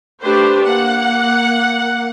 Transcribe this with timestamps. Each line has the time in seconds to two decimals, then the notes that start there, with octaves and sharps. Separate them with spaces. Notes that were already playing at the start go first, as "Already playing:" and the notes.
0.22 A3 D4 G4 B4 C5
0.64 A#3 F#5